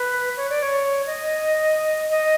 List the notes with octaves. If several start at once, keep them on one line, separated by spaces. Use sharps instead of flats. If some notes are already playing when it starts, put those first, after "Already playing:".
Already playing: B4
C#5
D5
C#5
D#5
D#5